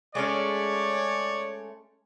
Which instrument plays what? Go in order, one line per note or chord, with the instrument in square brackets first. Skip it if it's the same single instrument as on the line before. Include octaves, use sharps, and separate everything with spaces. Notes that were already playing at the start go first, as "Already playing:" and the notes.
[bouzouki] G#3 A3 C#4 [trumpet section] C#5 D5